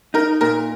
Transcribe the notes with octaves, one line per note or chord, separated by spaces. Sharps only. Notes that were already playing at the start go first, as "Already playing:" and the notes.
D#4 A#4
A#2 A#4